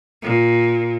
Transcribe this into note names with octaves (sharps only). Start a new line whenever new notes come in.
A#2